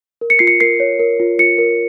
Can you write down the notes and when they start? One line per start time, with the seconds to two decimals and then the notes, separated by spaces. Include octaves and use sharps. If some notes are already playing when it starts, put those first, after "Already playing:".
0.21 A#4
0.30 C#7
0.39 F4 C7
0.47 C#7
0.60 A#4 C7
0.80 C#5
1.00 A#4
1.20 F4
1.39 F4 C#7
1.58 A#4